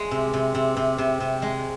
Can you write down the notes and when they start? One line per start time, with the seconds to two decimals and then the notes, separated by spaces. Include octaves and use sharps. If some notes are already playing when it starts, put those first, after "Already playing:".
Already playing: G#3
0.11 C3
0.33 C3
0.55 C3
0.77 C3
0.98 C3
1.20 C3
1.42 G#3